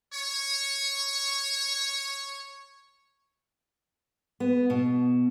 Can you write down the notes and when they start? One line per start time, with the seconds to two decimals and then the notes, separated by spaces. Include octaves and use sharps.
0.14 C#5 C#6
4.40 B3
4.70 B2